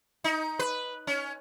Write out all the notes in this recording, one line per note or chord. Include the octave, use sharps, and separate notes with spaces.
D#4
B4
C#4